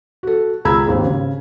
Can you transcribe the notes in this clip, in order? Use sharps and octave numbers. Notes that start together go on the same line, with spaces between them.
F#4 A4
C#2 G#4 A#5 B5 E6 G#6
G#1 D#2 G#2 D#3
C#3